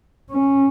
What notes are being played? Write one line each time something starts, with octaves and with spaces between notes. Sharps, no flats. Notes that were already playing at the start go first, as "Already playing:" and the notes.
C#4